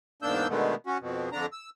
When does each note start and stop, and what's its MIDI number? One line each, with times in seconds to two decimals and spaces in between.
0.22 0.47 40
0.22 0.47 44
0.22 0.47 58
0.22 0.47 62
0.22 0.47 88
0.22 0.47 91
0.49 0.75 47
0.49 0.75 50
0.49 0.75 51
0.49 0.75 56
0.49 0.75 57
0.49 0.75 59
0.87 0.98 61
0.87 0.98 66
1.00 1.29 41
1.00 1.29 47
1.32 1.46 41
1.32 1.46 50
1.32 1.46 62
1.32 1.46 82
1.52 1.70 88